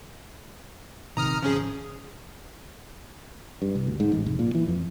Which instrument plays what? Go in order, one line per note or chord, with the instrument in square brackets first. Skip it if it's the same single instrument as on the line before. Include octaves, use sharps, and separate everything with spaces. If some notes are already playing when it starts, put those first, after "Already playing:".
[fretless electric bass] A#1 C3 D#3 [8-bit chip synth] A#5 D#6 F6
[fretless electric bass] G#1 C#3 [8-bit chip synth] F3 C#4 G#4
[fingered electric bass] G2
C2
D2
G#2
A1
F1
A#2
E3
F2